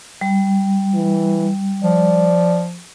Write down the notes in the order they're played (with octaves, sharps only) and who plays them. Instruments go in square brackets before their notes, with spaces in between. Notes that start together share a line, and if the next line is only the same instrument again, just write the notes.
[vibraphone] G3
[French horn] E3
[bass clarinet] F3 [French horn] D5